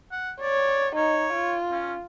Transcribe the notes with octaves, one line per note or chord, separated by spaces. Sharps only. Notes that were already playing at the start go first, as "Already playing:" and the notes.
F#5
C#5 D5
D#4 C#5
F4
C#4